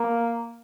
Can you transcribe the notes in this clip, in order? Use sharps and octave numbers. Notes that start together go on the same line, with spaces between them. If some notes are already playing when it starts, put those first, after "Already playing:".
Already playing: A#3